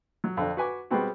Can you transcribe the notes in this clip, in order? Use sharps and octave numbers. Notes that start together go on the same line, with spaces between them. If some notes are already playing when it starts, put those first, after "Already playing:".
F#3
F2 D3 D4
F#4 B4 G#5 D6
G3 G#3 B3 C4 F#4